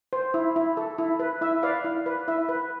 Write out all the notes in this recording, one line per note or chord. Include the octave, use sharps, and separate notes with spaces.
C5
E4
E4
A4
E4
B4
E4 E5
B4 D5 F5
E4
B4
E4 E5
B4